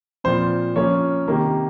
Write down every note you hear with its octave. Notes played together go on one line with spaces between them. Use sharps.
A#2 F3 C4 C5
F3 A#3 C#4 C#5
C3 D#3 A#3